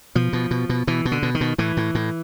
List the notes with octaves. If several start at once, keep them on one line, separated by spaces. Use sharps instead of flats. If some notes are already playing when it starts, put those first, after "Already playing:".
B2 F3
B2
B2
B2
B2 E3
B2
D3
B2
D#3
B2
A2 E3
A2
A2